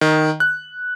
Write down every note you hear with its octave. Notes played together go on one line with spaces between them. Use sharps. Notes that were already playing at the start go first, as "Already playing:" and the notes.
D#3
F#6